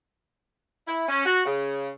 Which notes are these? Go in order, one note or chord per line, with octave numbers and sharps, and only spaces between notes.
E4
C#4
F#4
C#3